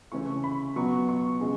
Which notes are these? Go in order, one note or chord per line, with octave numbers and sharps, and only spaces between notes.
C#3 E3 A3 C#4 C#6
B5
B2 F#3 B3 C#6
C#6
C#3 G#3